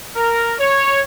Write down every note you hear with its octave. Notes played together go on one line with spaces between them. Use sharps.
A#4
C#5